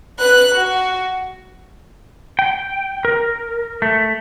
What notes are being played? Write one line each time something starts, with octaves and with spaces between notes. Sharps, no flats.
B4 F#6
F#4
G5
A#4
A3